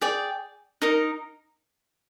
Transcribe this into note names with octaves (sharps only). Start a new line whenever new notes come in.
G#4 D5 G5
D#4 A#4 D#5